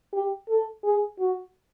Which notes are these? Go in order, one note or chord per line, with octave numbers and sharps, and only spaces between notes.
G4
A4
G#4
F#4